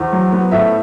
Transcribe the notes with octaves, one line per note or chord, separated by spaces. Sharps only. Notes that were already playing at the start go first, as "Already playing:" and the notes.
Already playing: E2 C5
F#3
B3
A2 E5